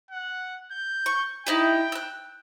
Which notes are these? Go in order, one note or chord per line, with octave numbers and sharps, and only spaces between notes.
F#5
G6
C#6
D#4 E4 G4 G5
E6 F#6